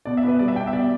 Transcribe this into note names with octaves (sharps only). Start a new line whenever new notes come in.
B2 D5
E5
B3 B4
G3 D5
E5
B2 G5
E5
B2 D5